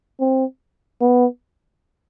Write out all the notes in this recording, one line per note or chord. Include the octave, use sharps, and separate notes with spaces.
C4
B3